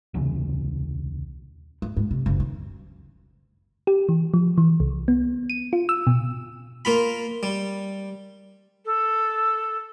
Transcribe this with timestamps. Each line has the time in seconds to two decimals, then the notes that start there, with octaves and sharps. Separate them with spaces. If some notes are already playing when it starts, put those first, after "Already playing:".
0.14 D#1 C2 C#3 E3
1.82 G#2
1.97 G#2
2.11 C3
2.26 F#1
2.40 D#3
3.87 G4
4.09 E3
4.34 F3
4.58 E3
4.80 C2
5.08 B3
5.50 D#7
5.73 F4
5.89 E6
6.07 B2
6.85 A#3 F4 B5
7.43 G3
8.85 A4